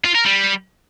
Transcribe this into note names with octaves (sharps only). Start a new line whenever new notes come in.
F4
A#4
G3